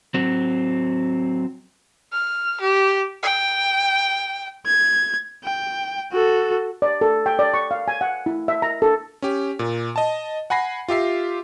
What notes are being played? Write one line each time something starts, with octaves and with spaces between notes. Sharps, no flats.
F#3 C4
F6
G4
G5
G#6
G5
F#4 A4
D5
A4
G5
D5
C#6
F5
G#5
F#5
E4
E5
A#5
A4
C#4 G4
A#2
D#5 A5
F#5 G#5 B5 A#6 C7
F4 G4 E5 C7